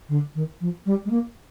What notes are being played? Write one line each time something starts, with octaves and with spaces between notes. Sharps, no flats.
D3
D#3
F3
G3
G#3
A#3